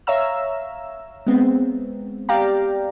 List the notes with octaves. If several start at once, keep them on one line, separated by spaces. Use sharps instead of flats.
C#5 E5 F5 A#5 E6
G#3 B3 C4
G4 D5 F5 G5 A#5